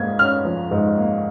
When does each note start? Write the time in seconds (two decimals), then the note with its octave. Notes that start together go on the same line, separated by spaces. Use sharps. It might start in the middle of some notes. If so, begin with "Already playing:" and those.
Already playing: G#2 A#3 G#6
0.19 C#4 F6
0.45 F3
0.71 G#2
0.98 A#3